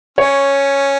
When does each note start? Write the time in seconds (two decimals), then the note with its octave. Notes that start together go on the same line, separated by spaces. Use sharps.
0.18 C#4 C#5